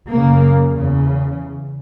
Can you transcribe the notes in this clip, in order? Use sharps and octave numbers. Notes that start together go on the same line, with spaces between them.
F#2 C#3 A#3
E2 C#3